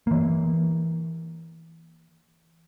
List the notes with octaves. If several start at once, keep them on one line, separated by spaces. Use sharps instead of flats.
E3 A#3